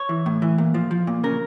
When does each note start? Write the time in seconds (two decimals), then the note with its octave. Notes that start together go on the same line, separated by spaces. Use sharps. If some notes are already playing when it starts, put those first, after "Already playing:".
Already playing: C#5
0.09 E3
0.26 A2
0.42 E3
0.58 A#2
0.74 F3
0.91 F3
1.07 A#2
1.24 C#3 A#4